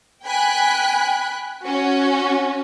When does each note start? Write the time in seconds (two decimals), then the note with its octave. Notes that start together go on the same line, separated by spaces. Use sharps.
0.25 G5 G#5 B5 F#6
1.64 C#4 F#4